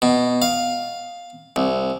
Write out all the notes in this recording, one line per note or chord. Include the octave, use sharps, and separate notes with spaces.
B2
F5
C2